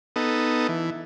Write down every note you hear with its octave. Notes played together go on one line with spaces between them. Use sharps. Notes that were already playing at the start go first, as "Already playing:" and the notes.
B3 D#4 A4
E3